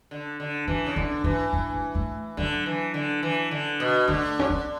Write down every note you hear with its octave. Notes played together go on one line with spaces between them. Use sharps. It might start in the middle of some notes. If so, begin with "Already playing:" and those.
D3
D3
E3 C#4
C#3
D3 B3
E3 C#4
B3
A3
A3
D3 F#3
E3
D3
E3
D3
B2
D3 A3
C#4
B3